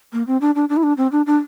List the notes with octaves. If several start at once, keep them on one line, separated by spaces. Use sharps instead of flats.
A#3
C4
D4
D4
D4
E4
D4
C4
D4
D4